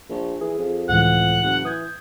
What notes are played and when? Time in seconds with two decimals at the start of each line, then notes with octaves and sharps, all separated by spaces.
0.09 A#1
0.41 E3 G#4
0.58 F2
0.89 C#2 A2 E3 F#5
1.42 F#1
1.65 E3 D#6 G6 G#6